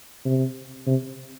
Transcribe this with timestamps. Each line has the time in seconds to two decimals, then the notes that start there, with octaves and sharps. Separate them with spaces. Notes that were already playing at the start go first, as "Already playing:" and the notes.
0.25 C3
0.87 C3